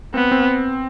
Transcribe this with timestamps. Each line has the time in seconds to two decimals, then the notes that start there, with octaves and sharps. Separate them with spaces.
0.14 B3 C4
0.31 C4